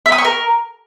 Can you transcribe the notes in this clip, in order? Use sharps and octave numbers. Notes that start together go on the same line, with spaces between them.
E5
D#6
C#6
A#4